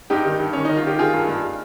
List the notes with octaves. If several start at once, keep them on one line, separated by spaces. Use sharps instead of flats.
G2 D#4 G4
D#3
G2
D#3 C#4
D#3 D#4
F4
D#3 G4
D#3 F4 G#4
G2
G2